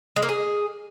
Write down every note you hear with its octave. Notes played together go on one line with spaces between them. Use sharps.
G#3
A#3
G#4